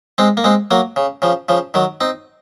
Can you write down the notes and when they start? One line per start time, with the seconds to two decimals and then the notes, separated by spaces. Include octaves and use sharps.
0.18 G#3 C4
0.37 A#3
0.44 G#3 C4
0.71 F#3 A#3
0.96 C#3
1.22 C#3 F3
1.49 C#3 F3
1.74 D#3 F#3
2.01 C4 D#4